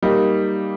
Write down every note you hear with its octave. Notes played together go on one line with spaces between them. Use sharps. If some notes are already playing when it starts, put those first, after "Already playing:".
G3 A#3 D#4